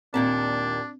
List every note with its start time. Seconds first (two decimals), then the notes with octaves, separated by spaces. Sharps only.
0.14 D#2 A#2 C4 D4 A5